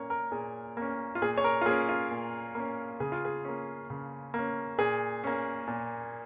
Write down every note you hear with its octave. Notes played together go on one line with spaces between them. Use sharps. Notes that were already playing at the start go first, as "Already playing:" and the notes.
Already playing: A#2 A#3 C#4 C#5
A#4
A#2 G#4
A#3 C#4
F4
A#2 G#4
C#5
A#4
F4
A#3 C#4 G#4
F4
A#2
A#3 C#4
C#3 G#4
F4
G#4
A#3 C#4
C#3
A#3 C#4
A#2 G#4
A#3 C#4
A#2